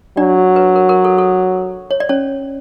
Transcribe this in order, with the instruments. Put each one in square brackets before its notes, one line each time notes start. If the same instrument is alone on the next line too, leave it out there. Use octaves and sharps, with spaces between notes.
[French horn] F#3 [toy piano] D4 D5
[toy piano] B4
A#4
A#4
A4
A4
C#5
D5
C#4 C#5